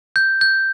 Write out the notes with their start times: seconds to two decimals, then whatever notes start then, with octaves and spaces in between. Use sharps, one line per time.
0.16 G6
0.41 G6